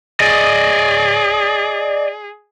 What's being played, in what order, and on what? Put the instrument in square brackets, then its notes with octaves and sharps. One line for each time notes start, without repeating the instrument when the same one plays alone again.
[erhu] G#4 [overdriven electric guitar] D5 D#5